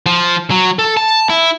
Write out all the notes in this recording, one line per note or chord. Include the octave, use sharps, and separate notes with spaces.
F3
F#3
A4
A5
E4